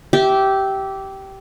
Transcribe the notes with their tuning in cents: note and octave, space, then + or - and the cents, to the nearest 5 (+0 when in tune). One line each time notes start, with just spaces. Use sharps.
G4 -15 E5 -10